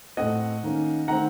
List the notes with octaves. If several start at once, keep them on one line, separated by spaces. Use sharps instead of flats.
A2 A3 C4 D#5 F#5
D#3 A#3 C#4
D#3 A3 C4 F#5 A#5